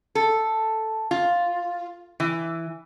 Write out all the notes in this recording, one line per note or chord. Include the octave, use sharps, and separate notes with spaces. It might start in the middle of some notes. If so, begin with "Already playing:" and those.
A4
F4
E3